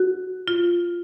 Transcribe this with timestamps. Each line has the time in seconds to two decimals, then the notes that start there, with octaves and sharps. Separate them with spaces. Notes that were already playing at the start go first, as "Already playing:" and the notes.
Already playing: F#4
0.48 F4